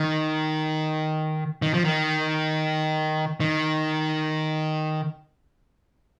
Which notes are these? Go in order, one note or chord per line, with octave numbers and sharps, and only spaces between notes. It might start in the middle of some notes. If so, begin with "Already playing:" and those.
Already playing: D#3
D#3
F3
D#3
D#3